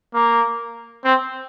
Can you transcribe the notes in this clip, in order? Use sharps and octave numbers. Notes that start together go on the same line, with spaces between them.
A#3
C4